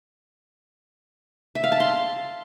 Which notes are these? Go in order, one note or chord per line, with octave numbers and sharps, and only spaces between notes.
E5
F5
A5
C6